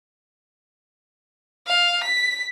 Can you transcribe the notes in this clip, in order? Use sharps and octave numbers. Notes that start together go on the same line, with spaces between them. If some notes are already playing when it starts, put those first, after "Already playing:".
F5
B6